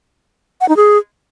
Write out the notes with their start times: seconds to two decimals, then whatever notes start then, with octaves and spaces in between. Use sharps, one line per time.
0.61 F#5
0.69 D#4
0.76 G#4